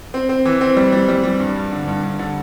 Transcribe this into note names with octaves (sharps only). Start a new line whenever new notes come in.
C4
C4
E3
C4
G3
G3
G3
G3
G2
G2
D3
G2
G2
D3